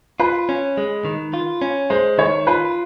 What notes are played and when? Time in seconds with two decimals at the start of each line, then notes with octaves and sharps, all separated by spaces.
0.20 F4 B4
0.49 C#4
0.77 G#3
1.05 D#3
1.34 F4
1.62 C#4
1.90 G#3 C5
2.18 D#3 C#5
2.47 F4 B4